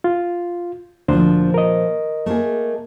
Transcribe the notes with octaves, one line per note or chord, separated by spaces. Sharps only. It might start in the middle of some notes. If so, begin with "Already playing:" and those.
F4
D2 A#2 F3 D4 C5
A#4 D#5
A3 A#3 G#4